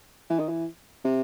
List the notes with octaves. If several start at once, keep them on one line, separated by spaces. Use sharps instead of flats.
E3
D#3
E3
C3